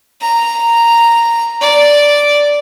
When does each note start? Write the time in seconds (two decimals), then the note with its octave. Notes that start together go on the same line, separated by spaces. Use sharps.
0.21 A#5
1.61 D5